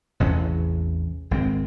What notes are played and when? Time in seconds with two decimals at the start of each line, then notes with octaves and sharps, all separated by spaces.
0.20 A1 E2 C3 C#4
1.31 G#1 G#3 C4